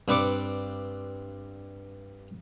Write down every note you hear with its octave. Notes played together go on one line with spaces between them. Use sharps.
G2 C4 B4 D5 C#6 D6